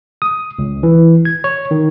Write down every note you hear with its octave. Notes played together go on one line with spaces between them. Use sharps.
D#6
C#2
E3
G#6
C#5
D#3